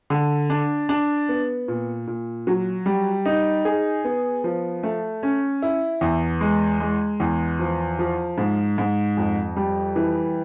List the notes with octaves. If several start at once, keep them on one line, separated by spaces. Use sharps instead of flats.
D3
D4
D4
B3
A#2
A#2
F#3
G3
D#4
G#4
B3
F3
A3
C#4
E4
E2
G#3
G#3
E2
F3
F3
G#2
G#2
F2
G3
E3